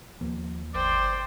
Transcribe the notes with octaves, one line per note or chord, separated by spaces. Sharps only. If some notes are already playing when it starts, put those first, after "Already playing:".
D#2 F3 A#3
G1 C5 D5 G5